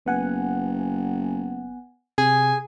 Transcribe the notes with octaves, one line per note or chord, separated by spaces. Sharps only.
F#1 B3 F#5 G#5
C3 G#4 G#5